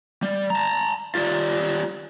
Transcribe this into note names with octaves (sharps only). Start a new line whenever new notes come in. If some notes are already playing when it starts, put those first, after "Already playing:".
G3
A5 A#5
G3 F4